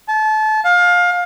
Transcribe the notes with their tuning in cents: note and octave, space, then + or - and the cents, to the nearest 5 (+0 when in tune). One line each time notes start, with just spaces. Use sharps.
A5 -30
F5 +25